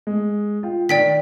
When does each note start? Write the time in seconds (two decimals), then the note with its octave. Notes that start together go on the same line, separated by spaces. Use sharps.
0.07 G#3
0.63 F4 G5
0.89 D#3 D5 G5 B6